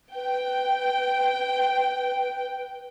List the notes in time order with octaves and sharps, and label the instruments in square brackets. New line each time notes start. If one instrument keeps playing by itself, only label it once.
[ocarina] B4 [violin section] G5